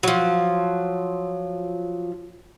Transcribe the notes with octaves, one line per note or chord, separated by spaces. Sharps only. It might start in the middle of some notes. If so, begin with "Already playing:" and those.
F3 F#3